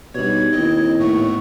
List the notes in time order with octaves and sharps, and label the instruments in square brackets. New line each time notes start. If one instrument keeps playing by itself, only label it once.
[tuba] B2 [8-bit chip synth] G3 C#5 [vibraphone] D4 D#4 G4 [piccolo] G#6
[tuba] D#2 [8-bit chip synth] C4 D#5 [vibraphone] E4
[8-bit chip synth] A2 A3 B3 [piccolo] C#6